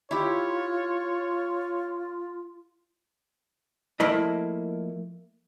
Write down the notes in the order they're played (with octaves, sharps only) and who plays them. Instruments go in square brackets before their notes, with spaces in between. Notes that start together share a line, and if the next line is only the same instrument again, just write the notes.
[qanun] E4 G4 [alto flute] F4 [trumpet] C#5
[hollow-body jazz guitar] F3 A3 A#3 E4 D#5